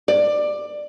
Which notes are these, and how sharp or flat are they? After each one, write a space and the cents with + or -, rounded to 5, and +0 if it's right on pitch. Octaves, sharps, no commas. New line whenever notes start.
D5 +15